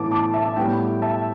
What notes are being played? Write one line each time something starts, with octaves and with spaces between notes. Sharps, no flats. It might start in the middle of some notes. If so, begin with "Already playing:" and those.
Already playing: A2 E3 B3 A5 D6
A5 D6
E5 A5
A2 G3 B3 G5
E5 A5